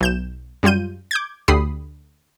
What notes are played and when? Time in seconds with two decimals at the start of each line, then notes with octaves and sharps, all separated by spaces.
0.01 B1 G6 E7
0.63 F#2 G3 F4 G6 D#7
1.11 D6 G6 G#6
1.48 D2 D3 G4 B5 D#6 C7